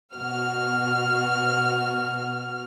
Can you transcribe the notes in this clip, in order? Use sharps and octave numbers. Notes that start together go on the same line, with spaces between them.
B2 F#4 F6